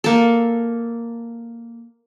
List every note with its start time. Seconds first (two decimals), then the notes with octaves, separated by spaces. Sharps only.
0.04 A#3 A4